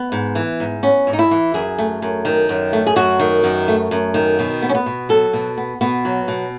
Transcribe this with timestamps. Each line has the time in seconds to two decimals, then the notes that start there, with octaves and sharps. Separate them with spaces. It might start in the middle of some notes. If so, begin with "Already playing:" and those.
Already playing: B3
0.12 G#2
0.35 E3
0.60 G#2
0.83 B3 C#4
1.07 G#2
1.13 D#4
1.19 E4
1.31 E3
1.54 F#2 G#4
1.78 A3
2.02 F#2
2.25 D#3
2.49 F#2
2.73 A3
2.87 G#4
2.96 F#2 F#4
3.19 D#3
3.44 F#2
3.68 A3
3.91 F#2
4.14 D#3
4.39 B2
4.62 B3
4.69 C#4
4.75 B3
4.86 B2
5.09 F#3 A4
5.33 B2
5.57 B3
5.81 B2 B3
6.05 F#3
6.28 B2